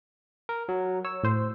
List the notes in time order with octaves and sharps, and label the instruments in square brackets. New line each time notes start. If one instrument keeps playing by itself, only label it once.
[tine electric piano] A#4
F#3
[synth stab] C#5 [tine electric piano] E6
[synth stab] A2 C5